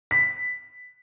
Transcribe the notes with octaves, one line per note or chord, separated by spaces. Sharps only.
B6